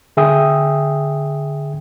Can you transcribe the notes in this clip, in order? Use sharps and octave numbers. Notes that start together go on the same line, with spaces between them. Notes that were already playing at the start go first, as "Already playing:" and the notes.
D3 G#4 E5 G5 D#6